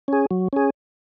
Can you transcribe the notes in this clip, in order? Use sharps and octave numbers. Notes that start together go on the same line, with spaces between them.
C#4 G#4
F#3
C#4 G#4